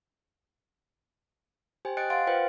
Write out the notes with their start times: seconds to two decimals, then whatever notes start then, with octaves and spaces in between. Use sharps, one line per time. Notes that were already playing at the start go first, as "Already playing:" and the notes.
1.85 G4 C5 G5 G#5
1.97 D#5 G5 F#6 A6 C#7 D7
2.10 F5 F#5 C6 A6 D7
2.27 F4 B4 C5 G5